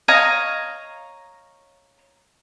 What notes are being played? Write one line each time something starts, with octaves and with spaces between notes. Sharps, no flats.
C#5 D#5 F5 A#5